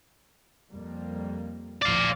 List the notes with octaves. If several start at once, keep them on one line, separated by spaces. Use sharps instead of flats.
F2 G3 A#3
A#1 D#2 F3 D5 F5